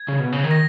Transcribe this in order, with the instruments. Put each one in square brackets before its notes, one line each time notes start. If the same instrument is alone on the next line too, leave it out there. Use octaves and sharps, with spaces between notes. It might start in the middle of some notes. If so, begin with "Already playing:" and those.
Already playing: [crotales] G#6
[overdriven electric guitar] C#3
B2
C#3
D#3
[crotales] A#6